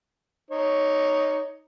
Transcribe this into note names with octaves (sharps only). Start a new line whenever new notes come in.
D#4 C#5